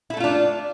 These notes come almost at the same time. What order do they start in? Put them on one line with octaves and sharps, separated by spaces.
E4 A4 A3 F4 D4